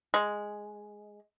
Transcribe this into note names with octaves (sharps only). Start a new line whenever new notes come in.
G#3